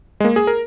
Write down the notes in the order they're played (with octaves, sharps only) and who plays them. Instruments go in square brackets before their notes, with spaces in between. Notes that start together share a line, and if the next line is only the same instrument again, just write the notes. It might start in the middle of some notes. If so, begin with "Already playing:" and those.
[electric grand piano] G#3
A#3
G#4
A#4